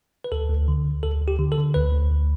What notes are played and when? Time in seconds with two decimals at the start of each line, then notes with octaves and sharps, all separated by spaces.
0.24 B4
0.32 D2 A4
0.50 D2
0.68 D3
0.85 D2
1.03 D2 A4
1.22 D2
1.28 G4
1.39 D3
1.52 A4
1.58 D3
1.74 D2 B4
1.93 D2
2.11 D2